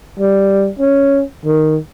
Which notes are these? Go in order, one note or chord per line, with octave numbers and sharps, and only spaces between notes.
G3
C#4
D#3